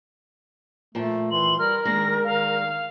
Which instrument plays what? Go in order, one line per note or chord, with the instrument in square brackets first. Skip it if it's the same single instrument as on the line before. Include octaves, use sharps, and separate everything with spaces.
[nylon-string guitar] A#2 F3 A5 [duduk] A3
[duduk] E3 [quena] C6 [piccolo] F#7
[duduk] G3 [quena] A#4 [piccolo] F6
[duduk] D#3 [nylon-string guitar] G#3 A#3 D4 [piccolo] A#6
[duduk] D#3 [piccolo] F5